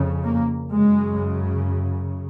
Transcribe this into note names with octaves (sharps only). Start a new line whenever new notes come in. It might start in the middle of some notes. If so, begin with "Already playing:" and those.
Already playing: F2 C#3
A#3
F#2 C#3 G#3